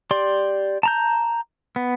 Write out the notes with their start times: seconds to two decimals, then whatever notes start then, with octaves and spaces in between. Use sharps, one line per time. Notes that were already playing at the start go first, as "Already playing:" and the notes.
0.11 G4 D5 C6
0.83 A5 A#5 G6
1.76 B3